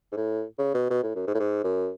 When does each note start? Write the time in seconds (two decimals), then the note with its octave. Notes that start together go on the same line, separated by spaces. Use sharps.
0.12 G#2
0.17 A2
0.58 C#3
0.74 B2
0.90 B2
1.03 A2
1.15 F#2
1.27 G#2
1.35 A2
1.39 G#2
1.64 F#2